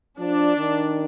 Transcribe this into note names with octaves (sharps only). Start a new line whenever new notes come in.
F3 D4
D#3